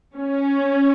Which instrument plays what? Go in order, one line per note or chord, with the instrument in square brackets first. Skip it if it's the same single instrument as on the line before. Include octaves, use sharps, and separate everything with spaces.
[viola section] C#4